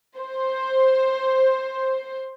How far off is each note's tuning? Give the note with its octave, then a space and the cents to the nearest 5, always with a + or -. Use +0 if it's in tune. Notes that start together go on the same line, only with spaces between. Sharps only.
C5 +10